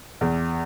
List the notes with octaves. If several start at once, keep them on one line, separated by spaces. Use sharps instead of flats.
E2